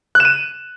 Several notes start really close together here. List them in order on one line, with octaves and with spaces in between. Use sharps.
F#6 E7 D#7